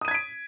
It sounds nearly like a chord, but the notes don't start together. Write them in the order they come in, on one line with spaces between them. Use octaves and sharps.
D#6 D#7 G#6 B6 D7